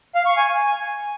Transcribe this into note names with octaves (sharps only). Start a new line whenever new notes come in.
F5
C#6
G#5